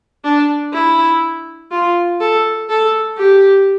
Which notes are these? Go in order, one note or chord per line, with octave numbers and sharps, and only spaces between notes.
D4
E4
F4
A4
A4
G4